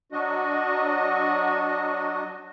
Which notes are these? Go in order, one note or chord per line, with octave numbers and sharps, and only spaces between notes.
F#3 D4 F#4 D#5